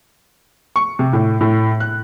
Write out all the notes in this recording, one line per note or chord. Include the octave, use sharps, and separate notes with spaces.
C#6
C3
A2
A2
F#6